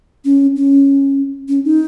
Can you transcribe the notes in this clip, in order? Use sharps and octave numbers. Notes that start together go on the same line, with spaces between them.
C#4
C#4
C#4
D#4